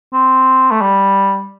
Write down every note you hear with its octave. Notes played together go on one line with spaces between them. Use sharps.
C4
A3
G3